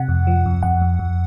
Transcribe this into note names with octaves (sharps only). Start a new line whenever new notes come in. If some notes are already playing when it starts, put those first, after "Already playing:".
Already playing: C3 F#5
F2
F3
F2
F2 F#5
F2
F2